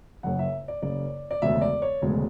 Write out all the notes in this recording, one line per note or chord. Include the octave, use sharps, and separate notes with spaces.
F#1 F#2 C#3 F#5
E5
D5
F#1 F#2 C#3 D5
D5
E1 D2 C#3 G#3 E5
D5
C#5
E1 D2 C#3 G#3